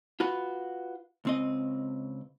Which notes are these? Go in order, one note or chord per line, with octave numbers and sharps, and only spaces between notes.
F4 F#4 B4
C#2 C4 D#5